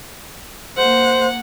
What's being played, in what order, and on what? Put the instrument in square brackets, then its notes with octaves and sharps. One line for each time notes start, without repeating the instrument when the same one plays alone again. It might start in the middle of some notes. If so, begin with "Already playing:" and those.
[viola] A#3 F#5 [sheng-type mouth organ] C5